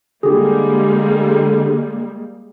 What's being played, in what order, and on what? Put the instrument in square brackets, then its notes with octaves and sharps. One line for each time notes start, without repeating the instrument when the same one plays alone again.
[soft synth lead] D3 [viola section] G3 G#3 A#3 [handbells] G4 G#4